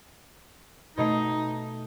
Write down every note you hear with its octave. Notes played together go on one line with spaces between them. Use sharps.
B2 A3 D#4 C7